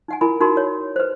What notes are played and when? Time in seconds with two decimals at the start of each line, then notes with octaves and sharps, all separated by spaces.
0.08 D#4 F#5 G#5
0.21 E4 A#4 G#5 B5
0.41 D#4 F#4 A#4 B5 C6
0.57 C#5
0.96 B4 C5